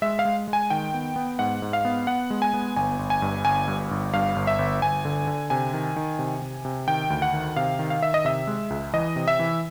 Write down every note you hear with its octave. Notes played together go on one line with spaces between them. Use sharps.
G#3 E5
F5
G#3
G#3
G#5
D#3 G5
B3
B3
G#2 F#5
G#2
F5
B3
B3 F#5
G#3
G#5
B3
G1 G#5
G1
G#5
G2
G1 G#5
G2
G1
G2 F5
G1
E5
G1
G1 G#5
D3
D3
C3 G#5
D#3
D#3
C3
C3
C3
D#3 G5
D2
F#5
D#3
C3 F5
D#3
F5
D#3 E5
D#5
C3 E5
G#3
C#2
E3 D#5
C3
E5
E3